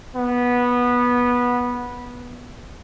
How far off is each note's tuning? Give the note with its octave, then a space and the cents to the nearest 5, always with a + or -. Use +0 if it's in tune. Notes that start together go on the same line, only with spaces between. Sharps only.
B3 -15